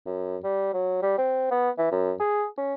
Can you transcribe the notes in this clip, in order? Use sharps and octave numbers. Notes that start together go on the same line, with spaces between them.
F#2
G3
F#3
G3
C4
B3
E3
F#2
G#4
C#4